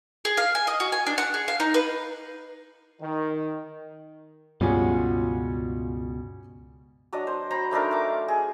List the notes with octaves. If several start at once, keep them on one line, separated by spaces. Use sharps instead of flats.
G#4
F5
G#5
D#5
F#4
G#5
D4
F#5
G#4
F5
D#4
B4
D#3
C#2 G2 B2 G3 C#4 F4 G#4 F#5
F#3 D4 D5 D#5
C5
C5 A#5 B5
A3 D4 D#4 A#4
A3 D6
G#4